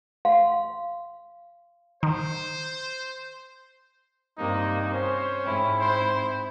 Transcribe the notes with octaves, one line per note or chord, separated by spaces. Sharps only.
F5 C6
D#3 C5
G2 C3 A#3 D#4
C#4 C5
G#2 C4 E4
C5